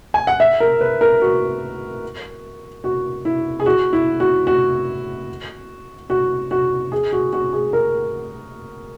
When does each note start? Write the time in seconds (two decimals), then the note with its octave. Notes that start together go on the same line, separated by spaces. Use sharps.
0.14 G#5
0.27 F#5
0.40 E5
0.60 A#4
0.81 B4
1.01 A#4
1.22 F#4
2.84 F#4
3.25 E4
3.60 G#4
3.66 F#4
3.93 E4
4.20 F#4
4.47 F#4
6.10 F#4
6.51 F#4
6.92 G#4
7.12 F#4
7.33 F#4
7.53 G#4
7.73 A#4